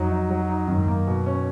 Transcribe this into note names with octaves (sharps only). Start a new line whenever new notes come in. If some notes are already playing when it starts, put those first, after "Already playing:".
Already playing: F2 F#3 D#4
D#4
F#3
D#4
F#2 D#3
G#2
F#2 A#3
B2
C#4